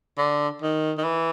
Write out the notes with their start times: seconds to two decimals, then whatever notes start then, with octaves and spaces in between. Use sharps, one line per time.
0.18 D3
0.62 D#3
0.98 D#3
1.04 E3